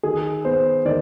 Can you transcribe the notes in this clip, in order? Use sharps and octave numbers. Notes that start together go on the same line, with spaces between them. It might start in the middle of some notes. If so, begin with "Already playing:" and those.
D#3 G#4
B3 C5
D#3 D5